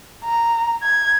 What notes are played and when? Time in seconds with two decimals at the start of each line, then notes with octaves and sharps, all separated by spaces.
0.24 A#5
0.83 G#6